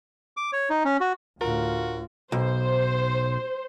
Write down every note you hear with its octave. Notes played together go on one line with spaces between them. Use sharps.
D6
C#5
D#4
C#4
F#4
D2 A2 F4 F#4 A#4
B1 C5